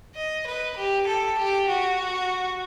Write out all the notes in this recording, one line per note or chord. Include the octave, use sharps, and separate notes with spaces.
D#5
B4
G4
A4
G4
F#4